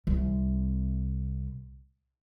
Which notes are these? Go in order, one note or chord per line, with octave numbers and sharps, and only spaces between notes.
C2 C3